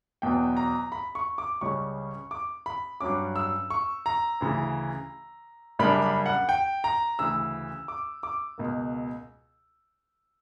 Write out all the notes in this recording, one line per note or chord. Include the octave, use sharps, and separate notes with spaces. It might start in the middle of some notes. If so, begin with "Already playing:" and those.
E2 B2 F#3 B3 G5
A#5
B5
C#6
D6
C#2 C#3 G3 C#4 C#6
D6
B5
G2 F#3 C#4 D6
E6
C#6
A#5
D2 C#3 E3
F#2 C#3 G3 A#3 D4 B5
B5
F#5
G5
A#5
D2 C#3 E3 E6
D6
D6
C#2 B2 A#3